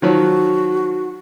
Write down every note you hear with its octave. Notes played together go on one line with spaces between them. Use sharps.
D#3 F3 F#3 F#4